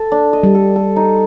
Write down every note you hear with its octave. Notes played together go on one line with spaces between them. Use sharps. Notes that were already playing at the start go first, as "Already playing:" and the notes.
Already playing: A4
D4
D#5
G3
A4
A4
D#4